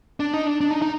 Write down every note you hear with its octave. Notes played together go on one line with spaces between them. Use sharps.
D4
D#4
D4
D4
D#4
D#4